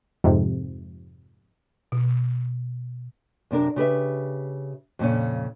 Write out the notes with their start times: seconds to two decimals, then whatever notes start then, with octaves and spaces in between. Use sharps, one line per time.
0.24 F2 G#2 C3
1.92 B2
3.51 F#2 C3 D4 A#4
3.76 C#3 G4 B4 E5
4.99 F2 A#2 C#3 C#4